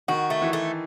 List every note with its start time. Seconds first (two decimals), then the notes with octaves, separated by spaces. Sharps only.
0.08 D#3 F#4
0.30 A3
0.42 E3
0.53 A3